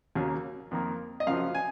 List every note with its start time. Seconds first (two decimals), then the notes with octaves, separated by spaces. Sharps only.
0.15 D#2 C#3 F#3 A#3
0.71 F2 D#3 A#3
1.20 D#5
1.27 F#2 C#3 F3 F5
1.55 G#5